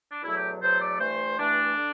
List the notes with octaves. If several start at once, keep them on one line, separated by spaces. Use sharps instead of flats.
D4
E2 B2 F#3 A3 E4
G4
E2 B2 F#3 A3 C5
D5
G2 E3 A3 C5
G2 E3 A3 D4
D3